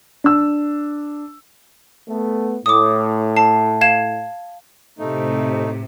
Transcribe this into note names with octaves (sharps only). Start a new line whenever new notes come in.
D4 E6
A3 B3
A2 D6 D#6
A5 C7
F5 G#6 E7
A2 C3 A3 D#4